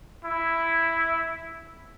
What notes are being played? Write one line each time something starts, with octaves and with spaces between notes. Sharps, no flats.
E4